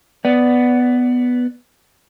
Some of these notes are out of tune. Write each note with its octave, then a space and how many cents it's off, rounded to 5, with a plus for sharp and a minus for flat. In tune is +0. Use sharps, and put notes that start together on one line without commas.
B3 +5 D5 +0